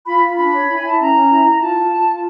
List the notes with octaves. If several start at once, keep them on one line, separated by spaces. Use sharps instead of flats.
F4 B5
F4
D4 B5
C#5
E4 G#5
E4 A5
C#4 A#5
C#4
E4
E4
F4 A5
F4
F4
F4